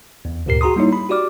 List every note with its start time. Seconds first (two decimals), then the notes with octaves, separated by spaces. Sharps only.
0.25 E2
0.46 D2 G2 A#2 G4 A#4 C7
0.61 F#4 G#4 A#5 C6 D#6
0.76 G3 A#3 D#4 E4 C#5
0.93 B5
1.09 F#4 G4 D5 D6 F6